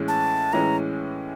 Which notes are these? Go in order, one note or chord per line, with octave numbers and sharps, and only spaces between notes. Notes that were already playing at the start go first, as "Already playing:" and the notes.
Already playing: A2 E3 G#3 C#4
A5
A2 E3 G#3 C#4 A#5